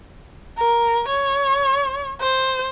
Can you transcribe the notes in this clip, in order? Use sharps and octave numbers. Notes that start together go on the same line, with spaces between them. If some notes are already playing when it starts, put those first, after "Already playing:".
A#4
C#5
C5